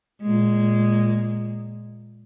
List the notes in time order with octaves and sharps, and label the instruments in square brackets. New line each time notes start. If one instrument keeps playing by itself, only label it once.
[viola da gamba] A#2 G#3